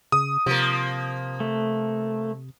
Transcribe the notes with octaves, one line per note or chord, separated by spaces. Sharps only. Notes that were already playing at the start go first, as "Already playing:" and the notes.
C#3 D#6
C3 F3 A#3
A3